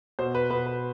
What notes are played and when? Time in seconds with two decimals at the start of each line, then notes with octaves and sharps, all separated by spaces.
0.19 B2 C5
0.35 B4
0.50 B2 B4
0.66 B4